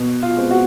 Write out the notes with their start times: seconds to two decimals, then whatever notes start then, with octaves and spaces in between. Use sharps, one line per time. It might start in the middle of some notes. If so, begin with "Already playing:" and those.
Already playing: B2
0.23 F4
0.37 G#3 C4
0.51 F#4